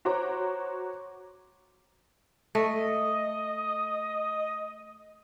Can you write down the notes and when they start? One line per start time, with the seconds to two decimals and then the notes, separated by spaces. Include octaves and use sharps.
0.05 F#4 C5 C#5 A#5 D6
2.55 A3 D#5